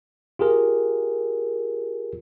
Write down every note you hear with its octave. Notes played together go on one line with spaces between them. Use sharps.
F4 G4 G#4 A#4